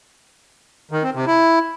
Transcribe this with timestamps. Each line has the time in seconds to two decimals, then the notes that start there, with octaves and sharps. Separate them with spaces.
0.91 D#3
1.03 C4
1.15 C3
1.26 E4